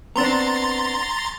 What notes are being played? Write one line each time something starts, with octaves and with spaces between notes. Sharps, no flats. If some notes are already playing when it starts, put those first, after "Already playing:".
B3 C4 D4 A#5 C6 A6